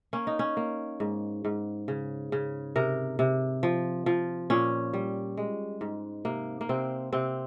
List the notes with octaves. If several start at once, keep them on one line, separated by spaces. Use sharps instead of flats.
A#3 C#4
D#4
C#4
A#3
G#2
G#2
C#3
C#3
C3 A#4
C3
F3
F3
A#2 C#4
G3
G#3
G#2
C3 A#3
A#3
C3 C4
C3 C4